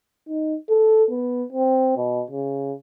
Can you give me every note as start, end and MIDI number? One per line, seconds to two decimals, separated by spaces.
0.28 0.55 63
0.69 1.04 69
1.10 1.44 59
1.53 1.96 60
1.97 2.23 47
2.30 2.73 49